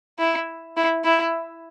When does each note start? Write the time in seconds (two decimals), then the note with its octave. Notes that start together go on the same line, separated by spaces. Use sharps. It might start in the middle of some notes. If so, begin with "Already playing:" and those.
0.19 E4
0.77 E4
1.04 E4